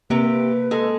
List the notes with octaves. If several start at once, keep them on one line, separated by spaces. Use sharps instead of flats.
C3 A#3 G4 B4
B4
G#3 A4